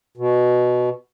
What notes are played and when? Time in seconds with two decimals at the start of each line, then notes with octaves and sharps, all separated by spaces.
0.17 B2